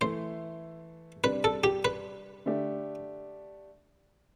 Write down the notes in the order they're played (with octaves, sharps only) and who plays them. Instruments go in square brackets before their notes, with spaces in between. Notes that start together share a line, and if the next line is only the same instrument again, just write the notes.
[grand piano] E3 A3 E4 [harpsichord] C5
[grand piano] C3 G3 D4 [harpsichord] B4
[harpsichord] A4
G4
B4
[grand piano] D3 A3 D4 G4